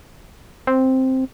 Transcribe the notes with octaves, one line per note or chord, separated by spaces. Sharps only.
C4